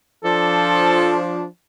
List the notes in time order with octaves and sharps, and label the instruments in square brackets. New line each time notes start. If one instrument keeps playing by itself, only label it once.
[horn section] F3 D4 [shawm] A4